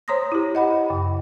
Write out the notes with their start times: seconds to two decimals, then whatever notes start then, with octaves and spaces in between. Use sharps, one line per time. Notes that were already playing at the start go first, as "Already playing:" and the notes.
0.08 C5 C#5 A#5 C6 D#6 A#6
0.32 E4 G4
0.55 D#5 F#5 B5
0.90 F#2 C#3